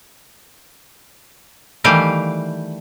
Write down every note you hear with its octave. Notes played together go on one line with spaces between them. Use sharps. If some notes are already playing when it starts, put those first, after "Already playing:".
D#3 E3 G3 A3 G4 F5